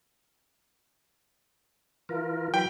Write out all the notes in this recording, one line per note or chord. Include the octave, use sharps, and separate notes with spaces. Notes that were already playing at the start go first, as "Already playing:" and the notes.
E3 F4 A#4
E3 F#3 G5 B5